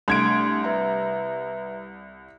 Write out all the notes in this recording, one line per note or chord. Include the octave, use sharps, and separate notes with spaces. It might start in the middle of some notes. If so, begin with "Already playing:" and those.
C2 A3 D4 C6 G#6 D7
B4 E5 A#5